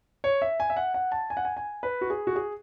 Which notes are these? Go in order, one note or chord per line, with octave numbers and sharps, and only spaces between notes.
C#5
E5
G#5
E5
F#5
F#5
A5
G#5
F#5
G#5
G#5
B4
F#4
G#4
F#4
G#4